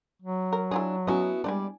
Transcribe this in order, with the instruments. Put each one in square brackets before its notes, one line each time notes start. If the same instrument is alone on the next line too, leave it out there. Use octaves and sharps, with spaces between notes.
[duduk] F#3
[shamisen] A#4
[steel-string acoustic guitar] D4 [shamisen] E4 F4 G#4
[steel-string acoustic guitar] B3 E4 F#4 [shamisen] C#4 D#5
[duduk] G3 [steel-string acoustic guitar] G#3 D5 [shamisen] D4 G5 G#5